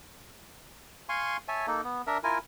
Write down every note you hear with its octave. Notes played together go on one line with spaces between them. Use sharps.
F5 G#5 C6 C#6
C#5 E5 G#5 A5
A#3 D#4 A4
B3
D4 A#4 E5
E4 F4 A#4 G#5